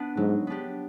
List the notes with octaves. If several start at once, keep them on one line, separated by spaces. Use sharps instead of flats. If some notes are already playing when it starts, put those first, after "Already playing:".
Already playing: B3 D4
G#2 F#3
B3 D4 G4